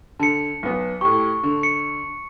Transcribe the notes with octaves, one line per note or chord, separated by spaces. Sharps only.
D3 A5 C#7
B1 B3
A2 G4 C#6
D3
C#7